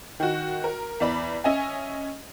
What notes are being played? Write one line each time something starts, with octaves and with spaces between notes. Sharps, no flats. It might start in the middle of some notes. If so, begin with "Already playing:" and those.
D#3 F#4
A#4
E2 D5 B5
C#4 D#5 E5 G#5